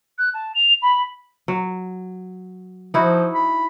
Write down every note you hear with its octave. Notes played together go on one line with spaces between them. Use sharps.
F#6
A5
F7
B5
F#3
F3 D#4 E4 F#4
B5